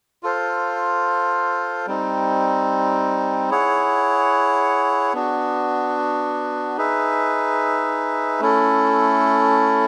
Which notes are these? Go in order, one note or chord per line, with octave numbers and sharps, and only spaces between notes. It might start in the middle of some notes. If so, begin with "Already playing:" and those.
F4 A4 C5 F5
G3 C4 D#4
E4 G#4 C#5 F#5
B3 D4 F#4
D#4 G#4 B4 E5
A3 C#4 E4 A4